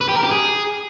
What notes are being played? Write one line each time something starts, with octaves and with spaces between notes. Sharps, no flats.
B4
G4
A#4
G4
G#4